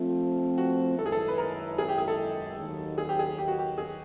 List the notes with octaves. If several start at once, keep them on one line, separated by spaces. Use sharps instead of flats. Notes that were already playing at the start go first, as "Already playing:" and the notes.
Already playing: F3 A3 C4 F4
F#4
F#2 D#3 G#3 C#4 E4 A4
G#4
A4
B4
A#4
G#4
G4
G#4
A4
D#2 D#3 F#3
G#4
G4
G#4
G4
F#4
G4
G#4